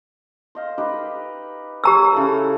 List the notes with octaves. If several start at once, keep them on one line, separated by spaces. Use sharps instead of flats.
C5 D#5 F5
D#4 G4 B4
G4 C#5 A#5 E6
C#3 E4 A4